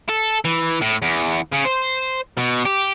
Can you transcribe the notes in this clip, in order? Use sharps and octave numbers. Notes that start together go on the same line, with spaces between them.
A4
E3
A2
E2
C#3
C5
B2
G4